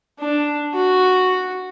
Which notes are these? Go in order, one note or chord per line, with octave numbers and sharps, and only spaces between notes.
D4
F#4